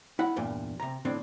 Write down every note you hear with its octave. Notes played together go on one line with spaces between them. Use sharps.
E4 F#5
E2 G2 A#2
C3 A#5
A2 D#3 C4 D4